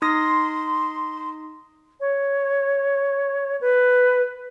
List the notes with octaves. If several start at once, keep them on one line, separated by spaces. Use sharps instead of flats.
D#4 C6 D#6 A#6
C#5
B4